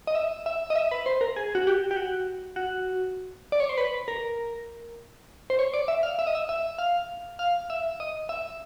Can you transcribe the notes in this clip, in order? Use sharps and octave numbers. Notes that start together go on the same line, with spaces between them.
D#5
E5
E5
D#5
E5
B4
C5
A#4
G#4
F#4
G4
G4
F#4
F#4
D5
C#5
C5
B4
A#4
C5
C#5
D5
E5
F5
E5
D#5
E5
E5
F5
F5
E5
D#5
E5